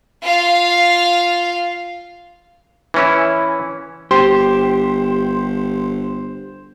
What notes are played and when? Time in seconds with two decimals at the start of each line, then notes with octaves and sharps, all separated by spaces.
0.23 F4 F5
2.94 E3 C#4 E4
4.11 G1 G4 C5 C6